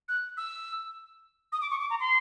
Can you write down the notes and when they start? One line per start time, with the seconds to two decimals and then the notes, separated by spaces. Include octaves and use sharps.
0.09 F#6
0.37 E6
1.52 D#6
1.62 D6
1.71 C#6
1.81 D6
1.90 A#5
2.00 C6